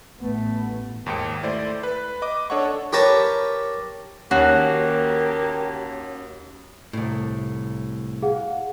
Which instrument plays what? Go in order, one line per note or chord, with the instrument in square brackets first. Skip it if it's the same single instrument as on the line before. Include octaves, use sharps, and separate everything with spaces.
[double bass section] A1 [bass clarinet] A3 [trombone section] B3
[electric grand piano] D#2 G#2 G5 C#7
A3 E4 C5 D5
B4
D#5 D6
D4 A4 C#5 D#5 F#5 C#6
[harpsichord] G4 A#4 B4 C#5 A5
[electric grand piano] D#2 C7 [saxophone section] A#3 G4 [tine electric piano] C#4 C#5 [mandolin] F#4
[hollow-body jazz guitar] C2 A2
[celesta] G#4 F5 F#5